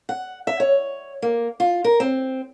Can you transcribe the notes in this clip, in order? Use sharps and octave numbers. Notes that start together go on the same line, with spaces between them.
F#5
E5
C#5
A#3
F4
A#4
C4